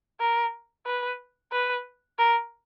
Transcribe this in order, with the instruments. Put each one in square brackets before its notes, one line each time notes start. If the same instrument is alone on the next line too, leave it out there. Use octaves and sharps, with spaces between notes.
[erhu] A#4
B4
B4
A#4